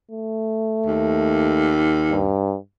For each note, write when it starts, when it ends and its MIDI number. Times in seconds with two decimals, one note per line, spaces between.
0.11 1.78 57
0.86 2.34 39
2.11 2.56 43